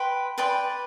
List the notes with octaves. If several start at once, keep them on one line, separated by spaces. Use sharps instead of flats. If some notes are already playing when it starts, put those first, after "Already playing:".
Already playing: B4 G5 C6
B4 D5 G5 C6